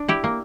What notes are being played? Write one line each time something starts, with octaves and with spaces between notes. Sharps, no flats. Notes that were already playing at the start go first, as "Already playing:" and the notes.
Already playing: D4
E4 G4
A#3